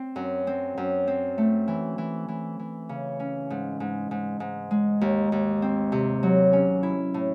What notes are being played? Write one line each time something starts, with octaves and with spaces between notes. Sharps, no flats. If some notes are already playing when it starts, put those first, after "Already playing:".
Already playing: C4
F#2
C4
F#2
C4
A3
E3
E3
E3
E3
C#3
C#4
G#2
G#2
G#2
G#2
G#3
D#2
D#2
C4
C3
F#3
C#4
E4
A2